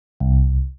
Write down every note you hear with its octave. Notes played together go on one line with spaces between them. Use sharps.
C2